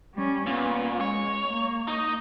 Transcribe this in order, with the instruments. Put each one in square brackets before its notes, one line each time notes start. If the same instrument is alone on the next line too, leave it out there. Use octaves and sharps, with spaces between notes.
[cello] G3 C#4
[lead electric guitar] A#2 [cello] B3 C#4
[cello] G#3 [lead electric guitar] C#5
[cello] A#3
[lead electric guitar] D#4 D#5